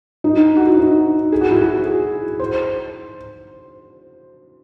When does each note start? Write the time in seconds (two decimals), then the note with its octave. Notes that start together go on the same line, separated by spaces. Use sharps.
0.24 D#4
0.57 F#4
0.67 E4
0.77 D#4
1.32 G#4
1.41 F#4
1.51 E4
1.61 F#4
1.86 G#4
2.40 C5